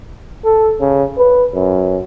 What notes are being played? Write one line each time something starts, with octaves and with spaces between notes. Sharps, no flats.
A4
C#3
B4
F#2